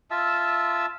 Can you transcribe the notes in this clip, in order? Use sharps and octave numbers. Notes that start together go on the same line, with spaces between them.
F4 E5 A5 E6